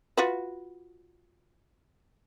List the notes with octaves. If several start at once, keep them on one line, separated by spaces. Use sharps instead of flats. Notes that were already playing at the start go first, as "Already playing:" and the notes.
F4 F#4 B4